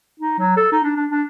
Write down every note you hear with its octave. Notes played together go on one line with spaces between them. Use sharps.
D#4
F#3
A4
D#4
D4
D4
D4